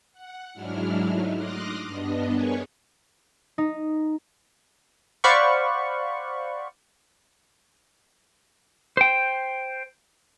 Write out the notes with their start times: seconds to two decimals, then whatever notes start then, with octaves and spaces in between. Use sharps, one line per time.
0.12 F#5
0.53 G#2 F#3 G#3 D4 E4 F6
1.05 F#3 A3 D#4
1.35 C6 D6 D#6 F6 F#6 A#6
1.86 G2 B3 D4 D#5
2.33 G#4 A#4 B4 C#5 G#5 C#6
3.58 D#4
5.24 C5 D5 F5 F#5 B5 C#6
8.97 C5 G5